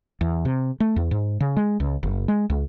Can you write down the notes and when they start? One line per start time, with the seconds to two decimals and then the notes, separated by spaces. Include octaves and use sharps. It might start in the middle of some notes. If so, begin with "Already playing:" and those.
0.21 E2
0.45 C3
0.80 A3
0.96 E2
1.11 G#2
1.40 C#3
1.57 G#3
1.80 C#2
2.03 F#1
2.28 G#3
2.50 C#2